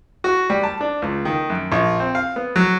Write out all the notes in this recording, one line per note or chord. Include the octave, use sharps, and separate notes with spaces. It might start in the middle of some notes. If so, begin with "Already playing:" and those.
F#4
G3
A5
D4
C#2
D#3
F#2
A#1
C4
F5
B3
F#3